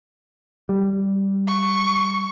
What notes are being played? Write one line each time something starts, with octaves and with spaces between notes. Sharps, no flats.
G3
C#6